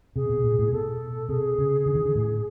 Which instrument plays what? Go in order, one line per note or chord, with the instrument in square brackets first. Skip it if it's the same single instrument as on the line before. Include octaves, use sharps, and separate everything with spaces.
[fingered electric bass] C3 [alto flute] G#4
[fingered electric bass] B2
A#2
A2
[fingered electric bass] B2 [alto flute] A4
[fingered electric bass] C3 [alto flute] G#4
[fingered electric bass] C#3
D3
D#3
D3
A2